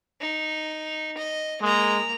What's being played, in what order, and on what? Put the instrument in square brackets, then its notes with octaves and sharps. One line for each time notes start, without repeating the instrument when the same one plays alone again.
[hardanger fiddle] D#4
D#5
[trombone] G#3 [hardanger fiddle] A#3 A#5